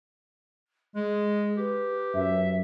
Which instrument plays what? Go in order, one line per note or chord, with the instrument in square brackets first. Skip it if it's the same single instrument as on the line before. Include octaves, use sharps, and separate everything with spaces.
[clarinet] G#3 [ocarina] G#4
[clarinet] G4 [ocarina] B4
[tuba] F#2 [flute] E5